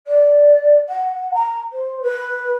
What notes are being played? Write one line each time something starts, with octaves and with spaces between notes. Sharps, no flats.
D5
F#5
A#5
C5
B4